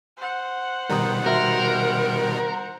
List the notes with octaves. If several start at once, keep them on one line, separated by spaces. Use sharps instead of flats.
C5 F#5
B2 D#3 G3 A#4 A#5 D#6
F#4 A#4 E5 C6